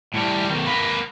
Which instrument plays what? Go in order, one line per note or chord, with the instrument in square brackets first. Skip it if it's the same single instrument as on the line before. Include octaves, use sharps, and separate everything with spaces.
[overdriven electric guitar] A2 G3
B1 D#3
A#3 B4